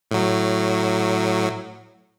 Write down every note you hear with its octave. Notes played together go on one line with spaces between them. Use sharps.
A2 F#3